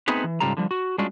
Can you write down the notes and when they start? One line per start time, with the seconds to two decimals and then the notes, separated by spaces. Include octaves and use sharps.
0.08 A3 B3 C4 D#4 G#4 B4
0.24 E3
0.40 G#2 C#3 G3 F4 A4 A#5
0.57 D3 F3 G3
0.71 F#4
0.98 G3 G#3 C#4 D4 F4 F#4